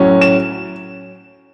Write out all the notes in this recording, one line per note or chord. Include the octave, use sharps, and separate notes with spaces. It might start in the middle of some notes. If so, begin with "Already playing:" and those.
Already playing: A2 F#3 C#4
E7